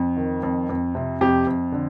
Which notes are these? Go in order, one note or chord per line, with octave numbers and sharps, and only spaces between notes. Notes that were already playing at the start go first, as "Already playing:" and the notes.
Already playing: F2
D#3
F2
F2
C3
F2 G4
F2
D3